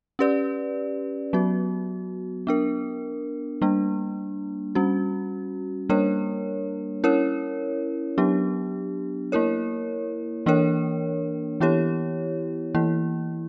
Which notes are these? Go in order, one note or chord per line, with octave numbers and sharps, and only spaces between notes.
C#4 G4 B4 D5
F#3 B3 F#4
B3 D4 A#4
G3 A#3 D4
G3 C#4 F#4
G3 A#3 D4 A#4 C#5
C#4 E4 A#4 C#5
F#3 B3 D4 G4
A#3 E4 A#4 C#5
E3 A#3 D4 A#4 C#5
E3 B3 E4 G4 C#5
E3 A#3 E4